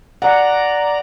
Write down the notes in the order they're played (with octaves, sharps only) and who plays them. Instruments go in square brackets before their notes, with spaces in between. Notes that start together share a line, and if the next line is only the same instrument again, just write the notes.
[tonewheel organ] D5 A#5 [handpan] F#5